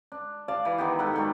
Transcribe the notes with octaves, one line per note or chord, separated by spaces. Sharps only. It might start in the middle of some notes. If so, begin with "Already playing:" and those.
D4
D5 F5 A5
E3
D#3 B3 G4
G#2 A4 F#5 B5
F#3 G3 A4